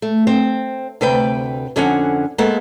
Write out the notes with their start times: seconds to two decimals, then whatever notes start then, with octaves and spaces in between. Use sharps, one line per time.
0.02 A3
0.27 C4
1.01 D2 C3 B4 G5
1.76 F2 D3 F3 C#4 F#5 G#5
2.38 G#3 A#3 B3 A4 F#5